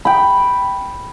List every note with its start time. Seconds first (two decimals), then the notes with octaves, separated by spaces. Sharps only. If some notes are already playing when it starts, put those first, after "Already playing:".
0.05 G5 B5